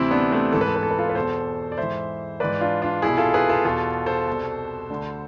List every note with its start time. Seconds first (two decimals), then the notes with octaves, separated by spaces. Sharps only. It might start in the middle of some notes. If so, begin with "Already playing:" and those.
Already playing: D2 C3 E3 C4 E4
0.11 B3 D4
0.32 A3 C4
0.52 G#2 E3 A4
0.61 B4
0.68 A4
0.76 B4
0.83 A4
0.91 B4
0.98 F4 A4
1.10 B4
1.15 E2 B2 A4 C5
1.72 D5
1.78 G#2 E3 C5 E5
2.40 G#2 E3 B4 D5
2.61 D4 F4
2.82 D4 F4
3.02 C2 B2 E4 G#4
3.18 F4 A4
3.34 G#4 B4
3.49 F4 A4
3.65 E2 B2 F4 A4
4.06 A4 C5
4.28 C2 B2
4.90 D2 D3